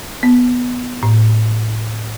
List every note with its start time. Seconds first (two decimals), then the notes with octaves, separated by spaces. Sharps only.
0.23 B3
1.03 A2